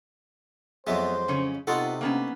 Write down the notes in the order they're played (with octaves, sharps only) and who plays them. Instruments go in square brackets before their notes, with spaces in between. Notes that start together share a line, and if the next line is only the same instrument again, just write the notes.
[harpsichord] F2 F#3 G#3 [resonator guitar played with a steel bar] B3 E5 [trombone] C5
[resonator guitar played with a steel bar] C#3 C#4 C#5
[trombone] C3 [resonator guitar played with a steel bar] B3 F4 F#5 [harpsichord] D#4 F#4 A4
[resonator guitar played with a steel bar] A#3 B3 C#4